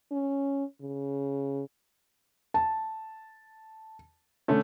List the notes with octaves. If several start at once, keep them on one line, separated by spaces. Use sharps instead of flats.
C#4
C#3
A5
D3 A3 C#4